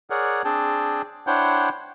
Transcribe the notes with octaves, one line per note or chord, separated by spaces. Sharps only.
G#4 A#4 C#5 D5 F#5
C4 D4 G#4 G5 A5
D4 E4 C5 C#5 F#5 G5